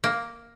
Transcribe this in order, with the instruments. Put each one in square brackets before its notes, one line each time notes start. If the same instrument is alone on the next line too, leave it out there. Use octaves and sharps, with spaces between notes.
[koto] A#3